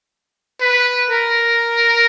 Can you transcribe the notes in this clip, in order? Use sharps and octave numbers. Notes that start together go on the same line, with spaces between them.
B4
A#4